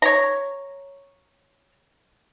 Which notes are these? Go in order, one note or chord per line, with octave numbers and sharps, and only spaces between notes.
C#5 A#5